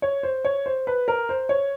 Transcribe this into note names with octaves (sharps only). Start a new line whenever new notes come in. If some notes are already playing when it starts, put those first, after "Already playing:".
C#5
C5
C#5
C5
B4
A#4
C5
C#5